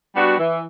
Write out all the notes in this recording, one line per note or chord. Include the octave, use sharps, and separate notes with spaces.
G3 B3 D4 F#4
E3